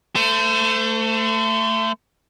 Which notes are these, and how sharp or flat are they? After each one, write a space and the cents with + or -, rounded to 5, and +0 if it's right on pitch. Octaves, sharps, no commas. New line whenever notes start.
A3 +20 C5 -30